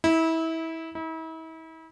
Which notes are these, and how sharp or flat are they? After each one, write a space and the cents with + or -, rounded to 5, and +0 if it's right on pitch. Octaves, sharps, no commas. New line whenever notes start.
E4 -25
E4 -40